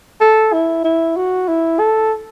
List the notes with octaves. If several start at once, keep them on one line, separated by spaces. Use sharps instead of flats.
A4
E4
E4
F#4
E4
A4